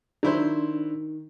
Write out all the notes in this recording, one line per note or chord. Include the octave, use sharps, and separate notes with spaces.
D#3 F#3 D4 E4 C5